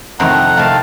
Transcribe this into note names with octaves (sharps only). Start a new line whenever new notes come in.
F2 C3 D#3 A3 F#5 A#5
C3 D#3 A3 F5 A5